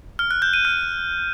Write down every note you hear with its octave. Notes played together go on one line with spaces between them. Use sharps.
F6
F#6
G6
D#7
F6